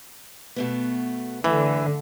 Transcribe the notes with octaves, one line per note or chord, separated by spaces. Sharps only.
B2 A3 B3
D3 E3 A3